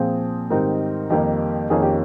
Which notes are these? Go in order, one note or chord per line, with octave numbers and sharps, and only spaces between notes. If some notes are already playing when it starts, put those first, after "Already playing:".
Already playing: A#2 F3 C4 G#4
G#2 D#3 G3 C4 D#4 A#4
F2 D#3 G3 A#3 D#4 G4
F2 D#3 A#3 C#4 G#4
G4